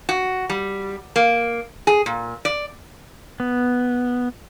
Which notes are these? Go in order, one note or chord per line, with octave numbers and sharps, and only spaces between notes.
F#4
G3
A#3
G#4
A#2
D5
B3